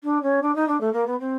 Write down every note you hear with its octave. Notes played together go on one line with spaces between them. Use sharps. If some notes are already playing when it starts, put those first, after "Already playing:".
D4
C#4
D4
D#4
D4
A3
A#3
B3
C4